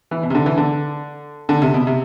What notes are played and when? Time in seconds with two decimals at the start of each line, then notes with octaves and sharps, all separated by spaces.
0.11 E3
0.23 B2
0.30 C3
0.35 D3
0.46 E3
0.57 D3
1.49 D3
1.62 C3
1.74 B2
1.87 C3